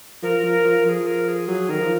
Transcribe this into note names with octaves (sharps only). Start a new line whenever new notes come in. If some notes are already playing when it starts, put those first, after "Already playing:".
F3 A#4
F3
F3
F3 G#4 A#4
A#4
G#4
F#3 G#4
D#3 A#4
F3